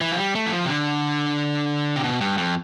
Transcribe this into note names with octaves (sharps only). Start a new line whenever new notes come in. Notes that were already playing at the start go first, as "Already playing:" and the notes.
E3
F3
G3
A3
E3
F3
C3
D3
C3
B2
G2
F2